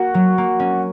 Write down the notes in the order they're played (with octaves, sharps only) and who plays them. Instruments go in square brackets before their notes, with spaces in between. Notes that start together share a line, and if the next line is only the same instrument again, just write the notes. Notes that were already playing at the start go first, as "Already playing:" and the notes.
Already playing: [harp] A#3 [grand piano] F#4
[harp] F#3
A#3
C#4